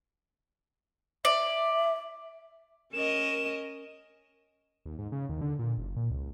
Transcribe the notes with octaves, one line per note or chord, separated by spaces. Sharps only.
D5 E5
C#4 A#4 D#5 E7
D#2
G#2
C#3
D#2
D3
A#2
F#1
A#2
C#2